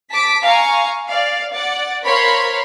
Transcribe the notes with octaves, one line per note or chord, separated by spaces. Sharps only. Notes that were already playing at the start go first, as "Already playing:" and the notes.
A5 D6 B6
F5 G#5 A#5 C#6
D5 F5
D5 F#5 A6
A#4 C5 C#5 F5 B5 C6